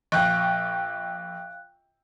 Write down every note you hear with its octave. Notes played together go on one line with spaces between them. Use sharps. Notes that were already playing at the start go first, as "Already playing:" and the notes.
A#1 F5 G5 C#6 F#6